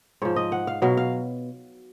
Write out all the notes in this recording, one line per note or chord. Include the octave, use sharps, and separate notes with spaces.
G#2 F3 C#5
D#5
F#5
F5
B2 F#3 F5
F5